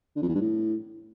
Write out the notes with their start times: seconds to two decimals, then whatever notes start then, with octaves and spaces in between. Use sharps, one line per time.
0.16 D3
0.22 F2
0.28 E2
0.35 G2
0.41 A2